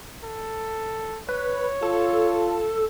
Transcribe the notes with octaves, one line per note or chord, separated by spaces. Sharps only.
A4
B4 C#5
F4 A4